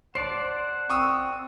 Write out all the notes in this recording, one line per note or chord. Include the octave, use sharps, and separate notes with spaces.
C5 D5 F#5 A5 C7
C4 C#6 D#6 E6